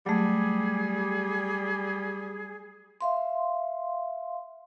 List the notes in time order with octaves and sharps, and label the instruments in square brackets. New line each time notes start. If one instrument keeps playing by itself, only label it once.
[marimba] F#3 A3 [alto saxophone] G3 [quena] G#4
[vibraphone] E5 F5 C6